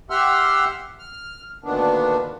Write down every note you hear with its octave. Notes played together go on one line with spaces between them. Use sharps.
G4 E5 F#5 C6 E6 F6
F6
D2 A#2 D#3 B3 D4